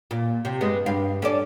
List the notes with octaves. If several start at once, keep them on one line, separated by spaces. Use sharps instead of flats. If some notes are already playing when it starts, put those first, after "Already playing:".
A#2
C3
G2 G#3 B3
G2 F5
C#4 A4 D5